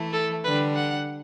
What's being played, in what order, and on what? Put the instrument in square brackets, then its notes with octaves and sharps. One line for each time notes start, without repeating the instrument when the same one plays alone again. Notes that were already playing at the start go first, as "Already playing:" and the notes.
Already playing: [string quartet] E3 A3 E4
[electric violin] A4
[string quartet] D3 G3 D4 [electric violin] B4
[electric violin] F#5